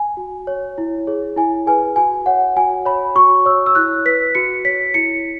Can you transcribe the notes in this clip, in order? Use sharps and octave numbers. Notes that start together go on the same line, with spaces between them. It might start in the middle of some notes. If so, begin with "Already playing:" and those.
Already playing: G#5
F#4
C#5
E4
G#4 C#5
E4 G#5
G#4 B4 G#5
F#4 G#5
C#5 F#5
F#4 G#5
C#5 B5
F#4 C#6
C#5 E6
E6
E4 F#6
B4 B6
F#4 C#7
C#5 B6
E4 C#7